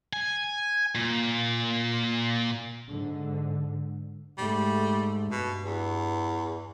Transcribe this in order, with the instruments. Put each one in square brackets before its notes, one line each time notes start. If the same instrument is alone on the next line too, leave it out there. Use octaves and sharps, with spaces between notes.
[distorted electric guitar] G#5
A#2
[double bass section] G#2 D3
[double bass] G#2 A3 [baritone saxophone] G3
[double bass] G2 [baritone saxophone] B2
[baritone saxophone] E2